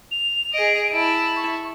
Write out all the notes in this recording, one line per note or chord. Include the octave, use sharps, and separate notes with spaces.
F7
G#4 D#5 D7
E4 A5
C#6